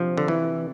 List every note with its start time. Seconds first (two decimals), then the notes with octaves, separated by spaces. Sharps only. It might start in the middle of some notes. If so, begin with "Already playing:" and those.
Already playing: C3 F3 D4
0.18 D3
0.28 E3